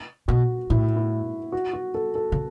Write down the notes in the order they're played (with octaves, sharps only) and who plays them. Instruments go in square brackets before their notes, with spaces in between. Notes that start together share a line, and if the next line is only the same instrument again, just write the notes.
[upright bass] B2 [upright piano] F#4
[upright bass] A2 [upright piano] E4
[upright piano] E4
F#4
F#4
A4
A4
[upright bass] C#3